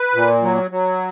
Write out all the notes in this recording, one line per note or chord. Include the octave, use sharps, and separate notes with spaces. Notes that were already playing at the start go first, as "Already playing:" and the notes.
Already playing: B4
A#2
F#3
F#3